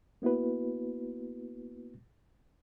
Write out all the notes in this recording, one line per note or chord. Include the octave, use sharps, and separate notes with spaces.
A#3 B3 E4 F#4 B4